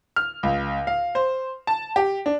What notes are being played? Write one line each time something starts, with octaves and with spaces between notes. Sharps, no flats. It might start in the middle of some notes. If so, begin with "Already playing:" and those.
F6
C#2
F5
C5
A5
G4
D4